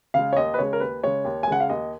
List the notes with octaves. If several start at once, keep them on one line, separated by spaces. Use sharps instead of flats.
C#3 G#3 F5
C#5
D#2 D#5
B4
C#3 G#3 C#5
A#4
D#2 B4
C#3 G#3 C#5
D#2
G#5
C#3 G#3 F#5
F5
D#2 D#5